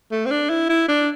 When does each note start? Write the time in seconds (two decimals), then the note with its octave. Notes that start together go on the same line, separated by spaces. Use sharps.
0.12 A3
0.26 C4
0.31 D4
0.50 E4
0.69 E4
0.88 D4